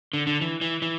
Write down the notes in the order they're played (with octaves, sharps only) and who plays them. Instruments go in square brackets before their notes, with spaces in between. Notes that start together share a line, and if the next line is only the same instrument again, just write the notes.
[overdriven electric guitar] D3
D3
E3
E3
E3